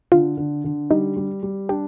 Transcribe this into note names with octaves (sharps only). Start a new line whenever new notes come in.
D3 F4
D3
D3
G3 D#4
G3
G3
D4 G4